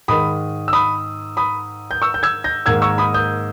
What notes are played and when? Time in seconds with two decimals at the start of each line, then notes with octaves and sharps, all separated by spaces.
0.08 G#2 D#3 G#3 B5 D#6
0.68 E6
0.73 B5 D#6
1.37 B5 D#6
1.91 G6
2.02 C#6 E6
2.14 G6
2.23 E6 G#6
2.44 G6 A#6
2.66 G#2 D#3 A#3 E6 G#6
2.82 C#6 E6
2.98 B5 D#6
3.14 D#6 G6